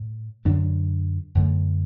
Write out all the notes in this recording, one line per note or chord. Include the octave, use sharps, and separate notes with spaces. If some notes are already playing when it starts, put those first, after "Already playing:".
Already playing: A2
F#2 D3 F#3 D4
F#2 D3 A3